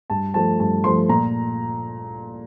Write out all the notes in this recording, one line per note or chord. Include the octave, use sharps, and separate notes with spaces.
G2 A5
F3 A3 A5
G2 A5
F3 A3 C6
A#2 A#5